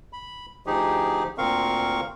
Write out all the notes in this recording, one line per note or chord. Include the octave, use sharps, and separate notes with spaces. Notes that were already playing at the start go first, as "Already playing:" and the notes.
B5
D2 F3 D#4 G4 G#4
D2 A#2 C4 A#4 F5 C#6